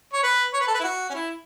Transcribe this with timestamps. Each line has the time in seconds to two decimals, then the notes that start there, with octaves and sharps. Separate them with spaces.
0.13 C#5
0.23 B4
0.54 C#5
0.60 B4
0.67 A4
0.74 B4
0.79 E4
0.84 F#4
1.10 C#4
1.14 E4